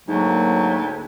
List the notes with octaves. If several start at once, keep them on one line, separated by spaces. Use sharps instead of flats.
D2 G#2 F#3 A#3